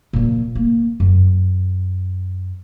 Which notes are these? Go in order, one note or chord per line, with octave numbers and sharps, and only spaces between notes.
A#2 F3
A#3
F#2